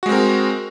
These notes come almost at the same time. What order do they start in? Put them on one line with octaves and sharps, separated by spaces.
F#4 G#3 C4 A#4